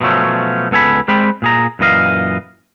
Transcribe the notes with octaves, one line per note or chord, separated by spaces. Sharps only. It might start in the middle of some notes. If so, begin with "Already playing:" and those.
B2 F3 F#3 A3 C#4
C#2 B3 A4 G#5 B5
G3 G#3 C4 G5 B5
A#2 G#4 A#5
F#2 A#2 E3 D#5 F5